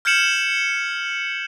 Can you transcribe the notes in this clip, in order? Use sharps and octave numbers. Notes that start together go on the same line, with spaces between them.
F6 G6 G#6 C#7 E7 F#7